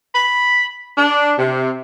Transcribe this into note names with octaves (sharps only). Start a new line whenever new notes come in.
B5
D4
C3